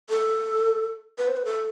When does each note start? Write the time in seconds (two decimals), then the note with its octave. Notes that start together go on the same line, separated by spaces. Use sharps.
0.09 A4
1.18 B4
1.28 C5
1.37 B4
1.45 A4